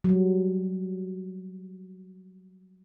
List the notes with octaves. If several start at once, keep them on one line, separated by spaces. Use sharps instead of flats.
F#3 G3